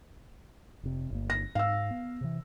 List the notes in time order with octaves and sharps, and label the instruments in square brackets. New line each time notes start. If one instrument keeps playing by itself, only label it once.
[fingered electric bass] F1 C3
G1 A#3
[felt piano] A#6
[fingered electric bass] G#2 [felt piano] F5 E6
[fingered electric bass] B3
C3 E3